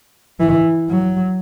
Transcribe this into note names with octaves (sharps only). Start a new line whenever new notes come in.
E3
F#3